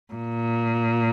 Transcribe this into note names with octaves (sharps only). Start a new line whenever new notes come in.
A#2